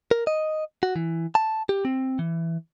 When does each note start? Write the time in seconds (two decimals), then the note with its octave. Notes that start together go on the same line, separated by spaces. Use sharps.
0.11 A#4
0.27 D#5
0.83 F#4
0.96 E3
1.35 A5
1.69 G4
1.85 C4
2.19 E3